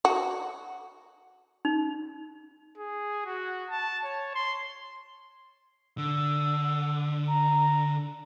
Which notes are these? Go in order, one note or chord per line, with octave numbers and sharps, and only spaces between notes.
F#4
D#4
G#4
F#4
A5
C#5
C6
D3 E6
A#5